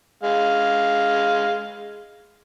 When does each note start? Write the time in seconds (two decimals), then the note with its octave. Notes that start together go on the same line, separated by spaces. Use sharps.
0.23 G#3 F5